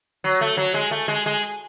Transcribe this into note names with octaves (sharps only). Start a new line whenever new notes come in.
F#3
A3
F#3
G#3
A3
G#3
G#3